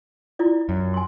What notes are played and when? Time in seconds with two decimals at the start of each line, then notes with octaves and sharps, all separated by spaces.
0.39 E4 F4 D5
0.69 F#2
0.94 G#5 C6